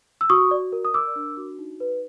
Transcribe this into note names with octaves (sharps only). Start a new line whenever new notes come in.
E6
F#4 C#6 D#6
D5
A#4
D#6
A#4 D6 E6
D4
F#4
D#4
B4